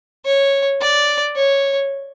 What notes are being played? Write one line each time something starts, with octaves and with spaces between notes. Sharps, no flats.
C#5
D5
C#5